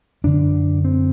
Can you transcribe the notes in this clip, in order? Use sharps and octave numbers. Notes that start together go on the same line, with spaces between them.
F#2 D3 D4
C4